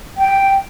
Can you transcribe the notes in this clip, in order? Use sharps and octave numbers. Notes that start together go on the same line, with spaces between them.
G5